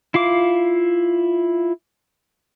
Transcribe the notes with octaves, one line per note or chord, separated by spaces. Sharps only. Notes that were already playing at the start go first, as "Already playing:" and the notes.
E4 F4 F5 D6